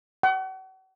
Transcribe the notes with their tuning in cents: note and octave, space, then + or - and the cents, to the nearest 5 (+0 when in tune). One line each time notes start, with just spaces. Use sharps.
F#5 +40